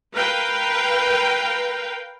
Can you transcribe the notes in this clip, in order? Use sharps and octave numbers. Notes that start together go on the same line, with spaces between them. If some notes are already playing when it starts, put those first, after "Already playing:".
A#4 B4 F5 G5